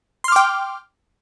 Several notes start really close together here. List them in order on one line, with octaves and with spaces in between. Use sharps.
C6 F6 D6 G5